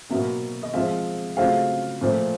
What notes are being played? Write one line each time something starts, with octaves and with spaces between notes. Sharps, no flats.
B2 F#3 A#3 E5
D#5
F3 G#3 C4 F4 E5
C#3 F#3 A3 C4 F4 F5
A#2 F3 A3